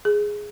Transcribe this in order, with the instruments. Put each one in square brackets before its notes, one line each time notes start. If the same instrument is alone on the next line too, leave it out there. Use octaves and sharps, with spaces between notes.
[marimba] G#4